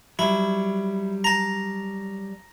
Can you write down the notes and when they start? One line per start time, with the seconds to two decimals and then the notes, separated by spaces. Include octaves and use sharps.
0.19 F#3 G3 E4
1.24 A5 A#5